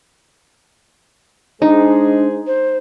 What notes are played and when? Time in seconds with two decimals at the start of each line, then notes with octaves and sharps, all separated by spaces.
1.62 G#3 D4 D#4 G#4 C5
2.47 C5